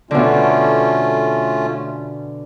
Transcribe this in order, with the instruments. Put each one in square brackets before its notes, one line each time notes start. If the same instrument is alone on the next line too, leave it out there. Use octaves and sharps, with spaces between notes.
[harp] B2 D3 [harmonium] A3 C#4 F4